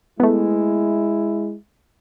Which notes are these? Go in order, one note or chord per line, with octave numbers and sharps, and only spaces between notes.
G#3 A3 B3 E4